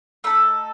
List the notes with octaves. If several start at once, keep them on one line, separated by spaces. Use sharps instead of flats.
A3 D#4 A4 B5